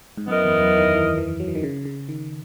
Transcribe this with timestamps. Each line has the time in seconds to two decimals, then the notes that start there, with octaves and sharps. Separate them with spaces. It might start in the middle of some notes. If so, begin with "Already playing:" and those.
0.17 G#2
0.28 F#2 B3 E4 A#4 D#5
0.45 E2
0.62 F#2
0.78 D#3
0.95 E3
1.18 E3
1.40 F#3
1.48 E3
1.55 D#3
1.63 C#3
1.85 C#3
2.08 D#3